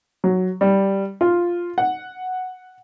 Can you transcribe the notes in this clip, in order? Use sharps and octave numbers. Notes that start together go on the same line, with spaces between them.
F#3
G3
F4
F#5